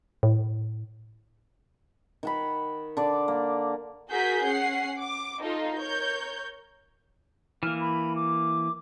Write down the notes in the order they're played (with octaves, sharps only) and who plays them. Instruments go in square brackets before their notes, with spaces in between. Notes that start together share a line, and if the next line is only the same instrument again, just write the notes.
[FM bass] A2
[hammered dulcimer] D#3 F#5 B5
D3 D5
A#3
[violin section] F#4 G#4 A#4 G6 B6
C#4 F#5 C7
D6
D#4 F4 A4
A#4 C#5 G6
[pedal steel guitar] E3 A#3 [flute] F6
[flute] B5
D6